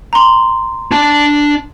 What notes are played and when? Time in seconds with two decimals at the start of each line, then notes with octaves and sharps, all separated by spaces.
0.13 A#5 C6
0.91 D4 A5